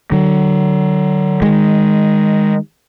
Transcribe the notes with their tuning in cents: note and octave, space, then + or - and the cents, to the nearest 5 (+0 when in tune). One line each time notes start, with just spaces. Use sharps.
D3 +35 F#3 +30
D#3 +0 G#3 -10